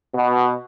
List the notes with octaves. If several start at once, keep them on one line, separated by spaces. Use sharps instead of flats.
B2